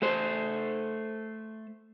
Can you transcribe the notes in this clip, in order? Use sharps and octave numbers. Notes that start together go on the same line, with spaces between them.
A3 A4 C5